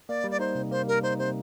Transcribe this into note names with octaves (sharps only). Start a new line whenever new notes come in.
A#3 D5
G3
D5
D#4 C5
C3
A#3 C5
G3 A#4
D#4 C5
C3 C5